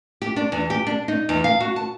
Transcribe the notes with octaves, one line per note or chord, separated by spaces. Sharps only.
G4
D4
E2
G4
D4
D#4
E2
F5
F#4
A5